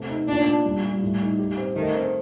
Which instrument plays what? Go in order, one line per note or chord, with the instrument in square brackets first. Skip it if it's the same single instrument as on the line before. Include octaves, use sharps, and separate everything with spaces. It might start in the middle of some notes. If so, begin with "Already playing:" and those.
Already playing: [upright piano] C3 A3
D#4
[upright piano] A#2 [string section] D4
[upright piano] A#2
G3
G3
A2
D#4
G4
C4
[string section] D#3 [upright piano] A3
[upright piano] C4